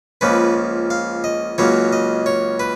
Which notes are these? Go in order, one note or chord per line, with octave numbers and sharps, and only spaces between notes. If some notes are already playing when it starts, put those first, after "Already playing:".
C#2 C#3 F3 A#3 B4
F5
D#5
C#2 C#3 F#3 A#3 C#5
D#5
C#5
B4